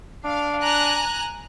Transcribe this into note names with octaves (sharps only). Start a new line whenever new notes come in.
D4 F5
G#5 A#5 F#6